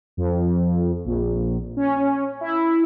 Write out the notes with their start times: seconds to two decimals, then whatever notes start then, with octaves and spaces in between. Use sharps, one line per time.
0.17 F2
1.05 A#1
1.77 C#4
2.41 E4